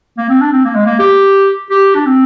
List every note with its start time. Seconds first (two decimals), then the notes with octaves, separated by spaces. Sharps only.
0.18 A#3
0.30 C4
0.41 D4
0.52 C4
0.65 A#3
0.75 G#3
0.86 A#3
0.99 G4
1.70 G4
1.95 D4
2.06 C4